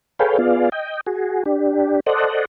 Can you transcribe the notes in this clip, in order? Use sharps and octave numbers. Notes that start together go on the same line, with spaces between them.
G#4 A4 B4 C#5 F5 G5
B3 F4 G#4 D5 F5
D#5 G5
F#4 G#4
D4 G4
A4 C5 D5 D#5 F#5